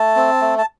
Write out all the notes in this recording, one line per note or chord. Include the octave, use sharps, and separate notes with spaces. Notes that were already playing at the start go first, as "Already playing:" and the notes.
Already playing: A3 A5
C4
A3
A5